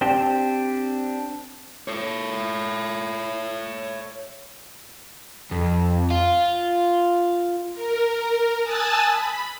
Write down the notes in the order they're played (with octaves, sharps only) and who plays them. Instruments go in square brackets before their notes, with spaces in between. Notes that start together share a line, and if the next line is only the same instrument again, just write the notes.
[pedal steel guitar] C4 D4 G4 C5
[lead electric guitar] A4 C#5
[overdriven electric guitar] F2
F4
[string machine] A#4
G#5 A5 D#6 E6 F#6 A6
B5